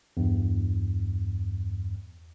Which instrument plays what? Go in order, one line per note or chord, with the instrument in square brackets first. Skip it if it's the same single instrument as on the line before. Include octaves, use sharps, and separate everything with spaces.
[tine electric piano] E2 G2